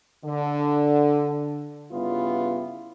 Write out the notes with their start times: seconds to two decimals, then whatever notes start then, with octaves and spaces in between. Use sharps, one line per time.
0.24 D3
1.92 G2 C#3 G3 B3 E4 F4